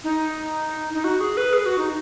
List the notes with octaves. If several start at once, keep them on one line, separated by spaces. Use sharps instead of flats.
D#4
D#4
F#4
G#4
B4
G#4
F#4
D#4